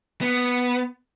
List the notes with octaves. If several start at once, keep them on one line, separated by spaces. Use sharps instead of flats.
B3